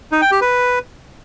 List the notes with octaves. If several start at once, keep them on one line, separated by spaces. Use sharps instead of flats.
D#4
G5
G4
B4